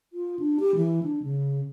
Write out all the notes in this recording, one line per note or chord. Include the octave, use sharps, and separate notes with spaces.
F4
D4
G4
E3
D4
C#3